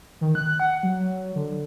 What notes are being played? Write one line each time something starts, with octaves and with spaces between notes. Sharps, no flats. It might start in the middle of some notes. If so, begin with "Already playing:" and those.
D#3
F#6
F#5
F#3
D3